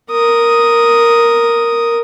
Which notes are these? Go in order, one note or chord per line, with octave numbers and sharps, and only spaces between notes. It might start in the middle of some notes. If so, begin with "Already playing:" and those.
A#4 D#6